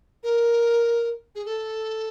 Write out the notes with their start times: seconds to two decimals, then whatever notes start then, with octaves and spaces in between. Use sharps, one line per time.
0.23 A#4
1.35 G#4
1.45 A4